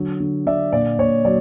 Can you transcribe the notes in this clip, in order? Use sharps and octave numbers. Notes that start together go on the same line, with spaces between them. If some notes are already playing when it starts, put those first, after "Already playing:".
Already playing: D3 F#3
D3
D3 D5 E5
A#2 D5
A#2 C#5
F#3 D5